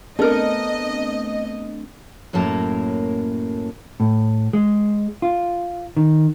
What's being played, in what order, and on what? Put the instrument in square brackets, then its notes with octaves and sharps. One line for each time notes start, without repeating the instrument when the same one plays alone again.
[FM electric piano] A3 C4 D4 [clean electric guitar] B3 [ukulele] A4 A#4 [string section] D#5
[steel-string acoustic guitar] F#2 A2 F#3 A#3 A5
[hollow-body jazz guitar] A2
G#3
F4
D#3